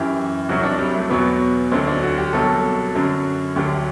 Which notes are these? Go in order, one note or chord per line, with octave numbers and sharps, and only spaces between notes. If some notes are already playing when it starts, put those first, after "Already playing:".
Already playing: F#2 E3 G4
C2 C3 F#3 F#4
D4
G3
A3
E2 B2 F#3 B3
D2 D3 F#3 C4
D4
F#4
G4
C2 B2 F#3 A4
F#2 D3 F#3
D2 D3 F#3 G4